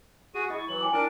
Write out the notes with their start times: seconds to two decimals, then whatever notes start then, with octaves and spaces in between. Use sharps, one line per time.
0.35 F#4 G#4 D#7
0.50 E4 D#5 C#6
0.69 E3 F#3 F#7
0.81 G5 G#5 D6
0.93 D4 E4 A#4 A5 D7